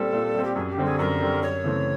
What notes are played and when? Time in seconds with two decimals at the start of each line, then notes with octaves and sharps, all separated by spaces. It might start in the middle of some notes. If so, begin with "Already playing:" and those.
Already playing: A#2 G3 C4 A4
0.13 A#2
0.35 G3 C4
0.44 G4
0.56 F#2 G#4
0.70 G4
0.77 D3 G3 C4
0.85 G#4
0.99 F#2 A#4
1.21 D3 G3 C4
1.42 F#2 C#5
1.64 C#3 E3 A3 C4